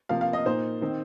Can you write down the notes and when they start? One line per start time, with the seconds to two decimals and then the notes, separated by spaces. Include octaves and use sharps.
0.09 C3 F3 A#3 F5
0.21 F5
0.33 D#5
0.45 A#2 A#3 D#4 C5
0.81 D#3 C4 D#4